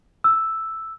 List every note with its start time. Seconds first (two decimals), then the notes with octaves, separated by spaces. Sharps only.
0.24 E6